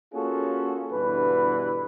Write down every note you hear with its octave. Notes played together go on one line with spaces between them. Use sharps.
A#3 C#4 F4 F#4 G#4 A4
G2 B2 D3 E3 B4